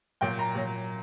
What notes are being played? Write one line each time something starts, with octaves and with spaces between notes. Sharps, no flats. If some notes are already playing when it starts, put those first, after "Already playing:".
A#2 F#3 G5
A#5
A#2 F#3